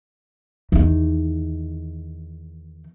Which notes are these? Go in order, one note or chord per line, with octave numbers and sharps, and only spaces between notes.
E2 D#3